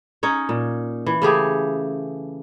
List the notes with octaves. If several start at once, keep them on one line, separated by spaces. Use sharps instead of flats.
C#4 D#4 C#5
A#2
E3
C#3 A3 G4 G#4